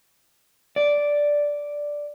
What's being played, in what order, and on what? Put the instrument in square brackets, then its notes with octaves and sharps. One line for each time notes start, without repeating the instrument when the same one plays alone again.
[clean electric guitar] D5